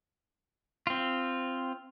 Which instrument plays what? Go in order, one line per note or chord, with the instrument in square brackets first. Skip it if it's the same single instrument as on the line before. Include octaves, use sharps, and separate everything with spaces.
[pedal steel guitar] C4 F4